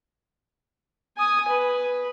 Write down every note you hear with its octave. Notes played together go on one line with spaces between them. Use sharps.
G#5 D#6
B4